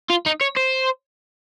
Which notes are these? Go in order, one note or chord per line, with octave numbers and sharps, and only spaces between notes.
F4
D#4
C#5
C5